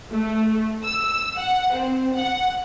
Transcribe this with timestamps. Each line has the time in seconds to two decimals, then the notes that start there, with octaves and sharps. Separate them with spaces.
0.12 A3
0.83 E6
1.36 F#5
1.72 C4
2.14 F#5